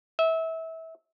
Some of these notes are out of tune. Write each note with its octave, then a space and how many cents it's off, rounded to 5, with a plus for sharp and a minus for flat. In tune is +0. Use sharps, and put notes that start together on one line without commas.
E5 -25